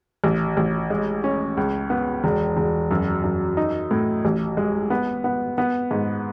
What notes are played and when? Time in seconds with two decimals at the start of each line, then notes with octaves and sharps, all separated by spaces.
0.24 A1
0.57 A1
0.90 G#3
1.24 C#4
1.57 C#2
1.90 B3
2.24 E1
2.57 E1
2.91 F#2
3.24 F#2
3.57 D#4
3.91 A2
4.25 A1
4.57 G#3
4.90 B3
5.24 B3
5.58 B3
5.91 G#2